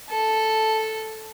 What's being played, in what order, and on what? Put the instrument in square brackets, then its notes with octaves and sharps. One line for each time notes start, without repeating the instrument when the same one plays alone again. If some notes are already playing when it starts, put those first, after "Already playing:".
[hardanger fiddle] A4